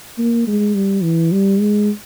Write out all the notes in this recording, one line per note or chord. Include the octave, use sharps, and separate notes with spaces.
A#3
G#3
G3
E3
G3
G#3